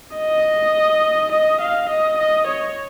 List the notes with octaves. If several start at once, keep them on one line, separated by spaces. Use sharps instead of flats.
D#5
D#5
F5
D#5
D#5
C#5